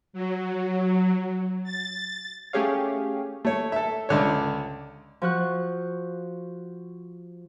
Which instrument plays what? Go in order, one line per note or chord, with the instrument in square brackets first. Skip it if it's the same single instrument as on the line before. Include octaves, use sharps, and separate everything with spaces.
[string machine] F#3
A6
[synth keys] A3 C#4 G4 G#4 C#5 F5
[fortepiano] A3 C#5
A4 E5
C#2 D3 C#5
[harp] F3 F#4 F#6